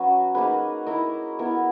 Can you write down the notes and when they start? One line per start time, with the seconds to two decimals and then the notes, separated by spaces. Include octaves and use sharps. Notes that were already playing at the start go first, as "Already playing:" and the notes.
Already playing: F#3 C#4 F#4 B4
0.35 A#3 D#4 G#4 B4
0.87 E4 A#4 D#5
1.39 B3 E4 A#4